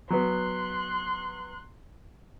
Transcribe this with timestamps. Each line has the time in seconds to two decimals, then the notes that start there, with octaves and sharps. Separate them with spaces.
0.10 F#3 B3 C6 F#6